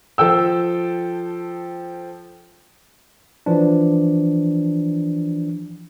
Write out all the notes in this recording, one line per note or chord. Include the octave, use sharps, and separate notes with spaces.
F3 A4 G5 E6
E3 F3 D4